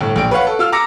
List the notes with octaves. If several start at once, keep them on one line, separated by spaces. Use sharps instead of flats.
G1 A2
A#1 G5 D7
B4 C#5 F5 F#5
A4
F4 E6 F6
A#5 D6 E6 A#6 C#7